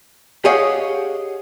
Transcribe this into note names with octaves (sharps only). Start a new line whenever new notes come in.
G4 G#4 C#5 D#5 F5 F#5